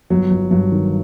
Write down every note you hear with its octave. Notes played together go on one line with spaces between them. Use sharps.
G1 F#3
G1
G2 F#3
D#3